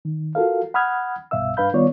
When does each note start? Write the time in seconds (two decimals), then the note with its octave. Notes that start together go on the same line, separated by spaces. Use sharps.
0.05 D#3
0.35 F4 F#4 A4 A#4 F5
0.74 F#5 B5 D#6 F6 G#6
1.31 C2 G2 B2 E5 F5 E6
1.57 G2 D4 B4 F5 B5 G6
1.73 D#3 G3 B3 F4 C#5 D5